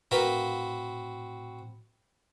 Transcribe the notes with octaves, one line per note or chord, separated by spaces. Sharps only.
A2 C4 F#4 A#4 B4 F5 B5